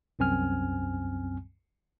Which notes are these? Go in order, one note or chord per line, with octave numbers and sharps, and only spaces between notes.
C2 F#2 C4 G#5 F6